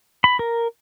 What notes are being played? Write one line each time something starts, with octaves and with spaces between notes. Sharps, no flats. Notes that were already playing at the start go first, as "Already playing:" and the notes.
B5
A#4